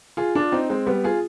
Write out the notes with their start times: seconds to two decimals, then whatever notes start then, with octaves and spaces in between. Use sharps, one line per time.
0.17 F4 G#4
0.35 D4 F4
0.52 C4 D#4
0.70 G#3 C4
0.86 G3 B3
1.04 F4 G#4